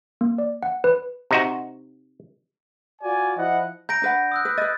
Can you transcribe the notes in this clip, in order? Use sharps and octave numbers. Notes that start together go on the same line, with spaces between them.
A#3
D5
F#5
B4
C3 D#4 F#4
F4 F#4 D5 G#5
F3 E4 D#5 F#5
A#5 G6 A#6 D7
D4 B4 F#5
D#6 E6 F#6
B4
B4 D#5 A6